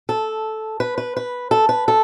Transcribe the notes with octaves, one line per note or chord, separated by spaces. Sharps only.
A4
B4
B4
B4
A4
B4
A4